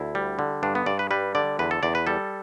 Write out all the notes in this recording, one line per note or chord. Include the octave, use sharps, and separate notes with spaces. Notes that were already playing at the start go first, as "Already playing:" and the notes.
Already playing: D2 E4
G3
D3
G2 D4
B3
G2 D5
B4
G3 B4
D3 D5
E2 B4
A4
E2 D5
B4
G3 A4